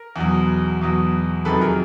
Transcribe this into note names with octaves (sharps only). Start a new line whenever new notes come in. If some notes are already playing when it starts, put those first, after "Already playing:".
Already playing: A#4
E2 B2 F#3
E2 B2 F#3
F2 C3 D#3 F#3 A4 B4
G#4 A#4